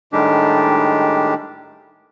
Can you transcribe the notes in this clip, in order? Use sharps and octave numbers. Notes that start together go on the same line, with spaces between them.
A2 D#3 G3 G#3 D4 G4